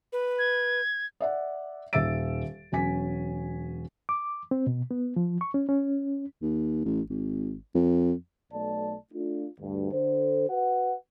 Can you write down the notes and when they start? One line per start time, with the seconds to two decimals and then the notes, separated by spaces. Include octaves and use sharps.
0.13 B4
0.39 G#6
1.21 D5 E5 F#5
1.93 D#1 E5 E6 A6 D7
2.72 E1 F#3 C#4 G#5 B6
4.09 D6
4.51 C4
4.67 B2
4.91 B3
5.16 F3
5.41 C#6
5.54 C#4
5.69 C#4
6.42 D#2
6.85 A1
7.09 G#1
7.75 F2
8.52 B1 A3 D5 A5
9.13 A3 D4 F4
9.60 D2 G2
9.92 D3 A4 C5
10.49 F#4 B4 F#5